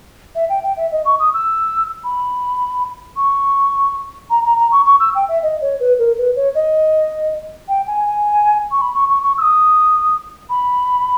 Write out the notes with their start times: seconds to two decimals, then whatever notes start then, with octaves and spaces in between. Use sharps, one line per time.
0.35 E5
0.49 G5
0.63 G5
0.77 E5
0.92 D#5
1.05 C#6
1.19 D#6
1.34 E6
2.04 B5
3.16 C#6
4.30 A#5
4.44 A#5
4.58 A#5
4.72 C#6
4.86 C#6
5.00 E6
5.15 G5
5.28 E5
5.43 D#5
5.61 C#5
5.80 B4
5.99 A#4
6.18 B4
6.36 C#5
6.55 D#5
7.68 G5
7.87 G#5
8.05 G#5
8.71 C#6
8.81 B5
8.95 C#6
9.09 C#6
9.23 C#6
9.38 E6
9.42 D#6
10.50 B5